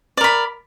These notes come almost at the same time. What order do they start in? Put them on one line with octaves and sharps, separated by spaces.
D5 A#4 B5